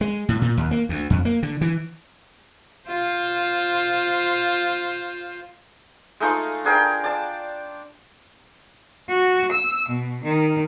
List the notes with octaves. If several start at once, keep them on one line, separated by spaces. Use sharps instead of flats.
G#3
A2
A#2
D#2
A#3
D2
F2
A#3
D3
E3
F4 C5
G#3 A3 D#4 F4
D4 G#4 A#4 G5
D5 A5
F#4
E6
B2
D#3